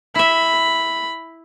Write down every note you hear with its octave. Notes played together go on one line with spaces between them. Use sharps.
E4 E5 B5